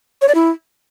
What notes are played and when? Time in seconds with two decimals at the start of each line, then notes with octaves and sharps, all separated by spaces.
0.22 C#5
0.28 D5
0.35 E4